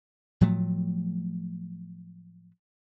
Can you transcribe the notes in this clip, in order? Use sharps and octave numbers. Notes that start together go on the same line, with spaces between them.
A2 F3 F#3 A3